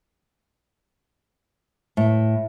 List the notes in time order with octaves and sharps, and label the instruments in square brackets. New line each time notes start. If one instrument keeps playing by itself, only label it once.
[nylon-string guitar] A2